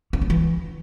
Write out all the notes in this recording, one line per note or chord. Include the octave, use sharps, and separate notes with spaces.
C#4
F#3
E3